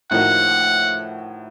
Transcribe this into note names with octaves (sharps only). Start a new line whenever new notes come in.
A2 F3 A#3 D#4 F#4 F#5